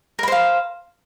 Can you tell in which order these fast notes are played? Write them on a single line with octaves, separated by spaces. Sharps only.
A#4 B5 C5 F5